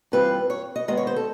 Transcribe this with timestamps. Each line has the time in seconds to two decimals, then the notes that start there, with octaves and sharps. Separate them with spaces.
0.12 G2 E3 G3 C4 F4 B4
0.50 C#5
0.76 D#5
0.88 D#3 G#3 B3 D#5
0.97 C#5
1.07 C5
1.16 A4